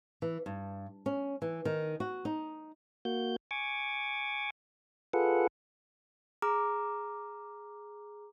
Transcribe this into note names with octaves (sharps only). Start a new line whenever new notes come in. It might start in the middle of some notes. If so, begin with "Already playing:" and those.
E3
G2
C#4
E3
D#3
F#4
D#4
A#3 F#4 G6
G#5 C#6 D6
F4 G#4 A4 B4 F#5
G#4 A#5 D6 F6